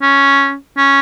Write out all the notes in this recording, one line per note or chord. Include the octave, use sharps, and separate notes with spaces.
C#4
C#4